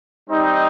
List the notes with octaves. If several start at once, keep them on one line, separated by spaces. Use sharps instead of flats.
G3 C4 D#4